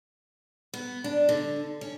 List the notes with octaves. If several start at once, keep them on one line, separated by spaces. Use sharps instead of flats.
B3
D4
D3
C#4